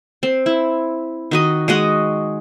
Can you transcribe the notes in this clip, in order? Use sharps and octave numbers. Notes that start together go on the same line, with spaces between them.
C4
E4
D#3 F#4 D#5
G#3 F#4 D#5 F#5